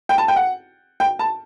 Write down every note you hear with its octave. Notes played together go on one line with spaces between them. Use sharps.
G5
A5
G5
F#5
G5
A5